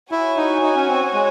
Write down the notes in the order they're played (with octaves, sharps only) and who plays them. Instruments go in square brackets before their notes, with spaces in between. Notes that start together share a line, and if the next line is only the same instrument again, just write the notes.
[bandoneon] E4 [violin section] F#4 C#5 G#5
[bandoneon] D#4
D#4
C#4
C4
G#3